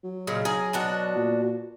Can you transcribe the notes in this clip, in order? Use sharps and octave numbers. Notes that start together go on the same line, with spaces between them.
F#3
A#2 C#3 G#3
G#4 A#4
B2 D4 F#4
A#2